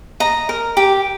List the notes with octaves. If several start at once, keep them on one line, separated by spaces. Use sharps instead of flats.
D#5 A#5
A#4
G4